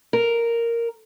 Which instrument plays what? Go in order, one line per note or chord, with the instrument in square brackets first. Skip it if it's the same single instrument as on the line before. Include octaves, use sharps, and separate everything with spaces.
[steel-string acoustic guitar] A#4